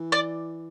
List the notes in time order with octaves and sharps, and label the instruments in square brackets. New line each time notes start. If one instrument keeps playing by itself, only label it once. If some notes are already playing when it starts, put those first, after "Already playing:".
Already playing: [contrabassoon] E3
[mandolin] D5